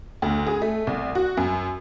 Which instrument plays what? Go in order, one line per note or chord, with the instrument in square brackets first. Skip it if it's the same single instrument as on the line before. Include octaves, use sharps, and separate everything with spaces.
[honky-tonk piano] D2
G#4
A3
C2
F#4
F#2